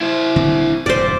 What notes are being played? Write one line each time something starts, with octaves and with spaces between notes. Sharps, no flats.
E4 C5
D#1 D3 C4
E1 G2 A#2 C5 D5